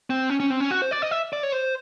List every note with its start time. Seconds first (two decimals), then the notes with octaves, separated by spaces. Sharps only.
0.10 C4
0.30 C#4
0.40 C#4
0.50 C4
0.60 C#4
0.71 F#4
0.82 C5
0.91 D5
1.02 D#5
1.11 E5
1.33 D5
1.43 C#5
1.52 C5